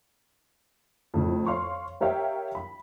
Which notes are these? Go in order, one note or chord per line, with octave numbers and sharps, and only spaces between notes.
F2 A2 C#3
C#5 F5 C6 C#6
G4 A#4 C#5 E5 F5 G5
B5